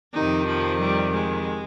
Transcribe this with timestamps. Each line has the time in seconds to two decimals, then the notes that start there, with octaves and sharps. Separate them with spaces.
0.15 F2 C3 D#3 D#4
0.47 F3
0.80 G3
1.14 G#3